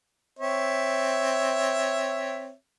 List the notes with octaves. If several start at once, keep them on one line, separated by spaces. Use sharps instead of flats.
C4 C#5 E5